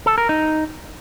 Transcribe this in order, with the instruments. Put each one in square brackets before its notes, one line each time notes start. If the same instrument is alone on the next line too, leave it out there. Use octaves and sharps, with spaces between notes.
[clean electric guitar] A4
A#4
D#4